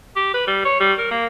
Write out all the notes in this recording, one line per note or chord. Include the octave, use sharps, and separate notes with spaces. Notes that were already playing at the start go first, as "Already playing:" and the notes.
G4
B4
G3
C#5
G3
A#4
A#3